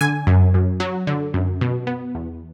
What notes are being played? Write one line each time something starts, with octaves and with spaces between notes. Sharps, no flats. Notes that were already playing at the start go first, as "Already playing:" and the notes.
D3 G#5
F#2
F#2
F#3
D3
F#2
B2
B3
E2